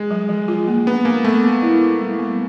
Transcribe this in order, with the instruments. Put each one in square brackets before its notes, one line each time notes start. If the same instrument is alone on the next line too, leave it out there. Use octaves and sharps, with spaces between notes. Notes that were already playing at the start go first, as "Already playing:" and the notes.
Already playing: [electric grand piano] G#3
[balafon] F#3
F3
F4
A#3
[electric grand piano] B3 [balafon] D4
[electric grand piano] A#3 [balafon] B3
[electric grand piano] A3 [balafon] B3
[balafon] B3
E4
E4
G3
B3